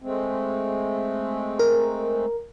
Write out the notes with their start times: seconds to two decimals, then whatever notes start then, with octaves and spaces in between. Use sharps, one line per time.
0.02 G#3 A3 C4
1.59 A#4